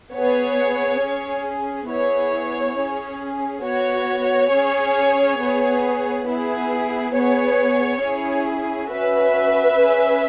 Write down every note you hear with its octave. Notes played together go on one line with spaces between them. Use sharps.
B3 G#4 C#5
C#4 G#4
B3 E4 G#4 C#5
C#4 G#4
B3 F#4 C#5
C#4 G#4
B3 G#4
B3 E4 G#4
B3 G#4 C#5
C#4 E4 G#4
C#4 F#4 B4 E5
C#4 G#4